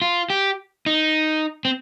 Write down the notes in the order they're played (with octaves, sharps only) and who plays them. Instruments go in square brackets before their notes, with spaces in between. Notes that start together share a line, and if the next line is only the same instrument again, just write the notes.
[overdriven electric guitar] F4
G4
D#4
C4